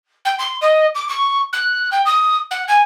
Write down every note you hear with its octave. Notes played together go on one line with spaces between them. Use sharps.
G5
C6
D#5
D6
C#6
F#6
G5
D#6
F#5
G#5